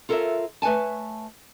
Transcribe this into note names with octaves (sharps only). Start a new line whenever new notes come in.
F4 A4 A#4 C#5 E5
A3 B4 C#5 G#5 A5